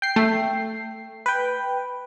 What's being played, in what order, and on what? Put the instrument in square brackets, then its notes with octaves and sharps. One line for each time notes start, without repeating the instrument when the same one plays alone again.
[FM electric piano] G5 C7
[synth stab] A3
[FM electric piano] B4 G5